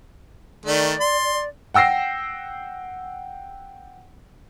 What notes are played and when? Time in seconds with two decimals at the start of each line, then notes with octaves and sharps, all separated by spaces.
0.66 D#3 A3 D5
1.00 C6
1.74 F#5 G5 E6 A#6 C7